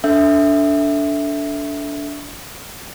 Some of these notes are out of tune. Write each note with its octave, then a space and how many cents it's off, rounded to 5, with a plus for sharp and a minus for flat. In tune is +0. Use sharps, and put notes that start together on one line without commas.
D4 -25 A4 +0 E5 +0